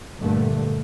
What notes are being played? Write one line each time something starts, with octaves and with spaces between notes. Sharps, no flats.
G2 A#2 D3 A3